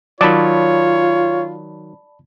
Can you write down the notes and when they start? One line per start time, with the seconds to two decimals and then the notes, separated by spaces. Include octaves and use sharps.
0.21 D#3 F#3 F4 C#5 D5 A5 B5